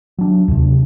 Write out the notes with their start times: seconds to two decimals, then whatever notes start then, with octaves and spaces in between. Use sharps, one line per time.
0.18 F#3 D4
0.48 D#2 C3